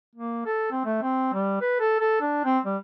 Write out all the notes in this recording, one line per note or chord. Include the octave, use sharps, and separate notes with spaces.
A#3
A4
C4
A3
C4
G3
B4
A4
A4
D4
C4
G3